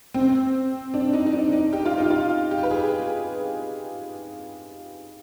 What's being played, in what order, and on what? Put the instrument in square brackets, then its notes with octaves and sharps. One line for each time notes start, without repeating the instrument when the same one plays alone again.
[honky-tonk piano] C4
D4
D#4
D#4
D4
D#4
G4
F4
D#4
F4
G4
B4
G#4